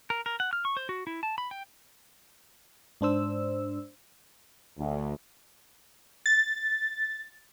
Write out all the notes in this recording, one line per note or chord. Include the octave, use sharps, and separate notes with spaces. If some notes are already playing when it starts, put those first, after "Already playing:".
A#4
A#4
F#5
F6
C#6
C5
F#4
E4
A5
B5
G5
G#2 D4 C5 E6
D2
A6